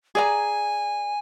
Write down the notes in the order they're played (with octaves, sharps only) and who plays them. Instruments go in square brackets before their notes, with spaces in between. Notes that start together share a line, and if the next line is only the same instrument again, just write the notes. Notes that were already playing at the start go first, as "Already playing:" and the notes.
[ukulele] G#4 D5 A#5 [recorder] G#5